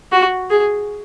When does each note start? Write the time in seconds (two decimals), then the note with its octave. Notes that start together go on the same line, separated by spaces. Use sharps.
0.12 F#4
0.50 G#4